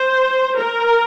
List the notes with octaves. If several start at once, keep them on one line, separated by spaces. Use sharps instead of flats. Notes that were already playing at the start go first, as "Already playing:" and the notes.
Already playing: C5
A#4